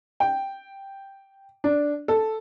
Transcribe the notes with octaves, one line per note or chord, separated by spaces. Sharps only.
G5
D4
A4